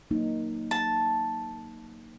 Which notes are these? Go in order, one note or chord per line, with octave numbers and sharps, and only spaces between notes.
F#3 A#3 D#4
A5